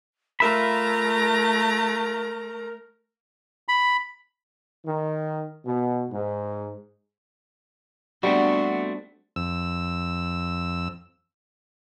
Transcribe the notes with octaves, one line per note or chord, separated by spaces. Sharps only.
A3 F4 A#4 E5 A#5 B5
B5
D#3
B2
G#2
G3 A3 B3 C4 D4 F#4
F2 E6